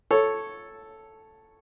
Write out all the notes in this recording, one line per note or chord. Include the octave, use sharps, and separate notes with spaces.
A4 C#5